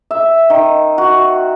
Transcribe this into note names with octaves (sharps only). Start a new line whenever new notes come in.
E5
D#3
F#4